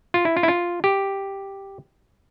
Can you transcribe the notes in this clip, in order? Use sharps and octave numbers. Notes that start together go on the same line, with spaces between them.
F4
E4
F4
E4
F4
G4